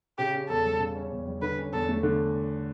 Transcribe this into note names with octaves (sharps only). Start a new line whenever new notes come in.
C#3 G4
C#4
E2 A4
G3
C#3
C#4
E2
G3
D3 B4
C#4
E2 A4
A3
D3